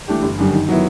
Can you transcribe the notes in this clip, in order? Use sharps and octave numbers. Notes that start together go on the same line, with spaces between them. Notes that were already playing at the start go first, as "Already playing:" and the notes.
E3 A3 D4 G4
G1
F#2 D3 G3
D#3
F#3 B3 E4